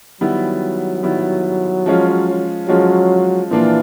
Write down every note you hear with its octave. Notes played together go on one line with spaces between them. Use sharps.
D#3 F#3 G3 B3 E4
D#3 G3 B3 E4
F3 G#3 C#4 F4
F3 F#3 G#3 C#4 F4
A#2 E3 F3 A#3 D4 F4